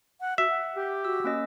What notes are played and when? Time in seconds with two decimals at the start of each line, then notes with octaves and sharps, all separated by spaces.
0.21 F#5
0.38 F#4 E5
0.50 F#5
0.76 G4
1.04 F#4 E6
1.24 A#3 C#4 D#5